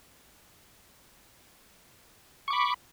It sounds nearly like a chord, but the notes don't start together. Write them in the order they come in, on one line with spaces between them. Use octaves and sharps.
C#6 D6 B5